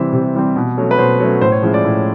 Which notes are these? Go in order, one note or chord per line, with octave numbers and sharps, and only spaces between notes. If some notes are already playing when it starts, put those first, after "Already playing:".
Already playing: C3 E3 G3 C4 E5
C3
E3 G3 C4
B2
F#3 A3 C#4
B4
B2 C5
F#3 A3 C#4
A2 C5
C#5
F3 G#3 C#4 E4
D5
A2